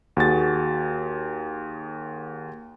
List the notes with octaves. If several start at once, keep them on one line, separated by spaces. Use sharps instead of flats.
D#2 F#4 G#4 A6